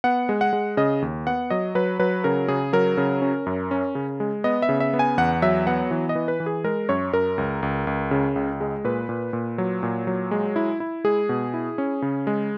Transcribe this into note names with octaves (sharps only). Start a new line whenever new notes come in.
B3 F#5
G#3
F#5
G#3
C#3 D#5
D#2
B3 F#5
F#3 D#5
F#3 B4
F#3 B4
C#3 A#4
C#3 G#4
F#3 A#4
C#3
C#4
F#2
C#4
C#3
G#3
B3 D#5
E5
C#3
E5
B3
G#5
E2 F#5
F#3 E5
B3 F#5
E3
D#5
E3
B4
E3
G#4
G#3 A#4
F#2 C#5
F#2 A#4
C#2
C#2
C#2
C#3
C#2
G#3
A#2 B4
A#2
A#2
F#3
A#2
F#3
G#3
E4
E4
G#3 G#4
B2
E4
C#4
C#3
G#3